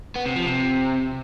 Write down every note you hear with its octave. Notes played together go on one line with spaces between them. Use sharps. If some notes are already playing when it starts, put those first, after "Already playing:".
B3
C3
F3
C3